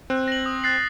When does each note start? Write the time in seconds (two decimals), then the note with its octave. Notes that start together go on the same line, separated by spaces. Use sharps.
0.10 C4 F#6
0.28 A#6 F#7
0.46 D#6
0.64 F#6 A6 C7 F#7